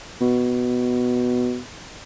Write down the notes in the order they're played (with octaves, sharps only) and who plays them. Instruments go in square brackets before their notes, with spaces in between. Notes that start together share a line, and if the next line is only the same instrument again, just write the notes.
[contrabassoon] B2